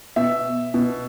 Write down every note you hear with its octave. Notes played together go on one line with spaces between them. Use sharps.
B2 E5
B2